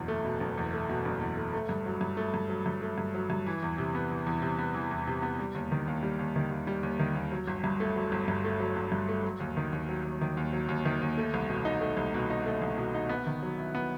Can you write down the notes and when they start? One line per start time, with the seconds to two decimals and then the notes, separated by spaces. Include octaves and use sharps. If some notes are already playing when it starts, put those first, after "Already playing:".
Already playing: F#1 E2 B2
0.08 A3
0.25 B2
0.40 F#1
0.57 E2
0.73 A3
0.89 B2
1.05 F#1
1.21 E2
1.37 A3
1.54 A3
1.69 G2
1.86 F#3
2.01 G2
2.17 A3
2.34 G2
2.49 F#3
2.66 G2
2.82 A3
2.98 G2
3.15 F#3
3.30 G2
3.47 E3
3.63 E2
3.78 C3
3.95 B3
4.10 E3
4.26 E2
4.42 C3
4.59 B3
4.75 E3
4.91 E2
5.07 C3
5.22 B3
5.39 G3
5.55 D#2
5.72 D#3
5.87 D#2
6.03 G3
6.19 D#2
6.36 D#3
6.51 D#2
6.67 G3
6.83 D#2
6.99 D#3
7.15 D#2
7.32 F#3
7.48 G1
7.64 G2
7.80 A3
7.96 F#3
8.12 G1
8.28 G2
8.44 A3
8.60 F#3
8.76 G1
8.92 G2
9.09 A3
9.24 F#3
9.40 D#2
9.57 D#3
9.73 D#2
9.89 F#3
10.05 D#2
10.21 D#3
10.37 D#2
10.53 F#3
10.69 D#2
10.85 D#3
11.02 D#2
11.17 A3
11.34 C2
11.49 B2
11.65 D#4
11.81 A3
11.97 C2
12.14 B2
12.30 D#4
12.46 A3
12.62 C2
12.78 B2
12.94 D#4
13.09 B3
13.27 D#3
13.43 F#3
13.58 E4
13.75 B3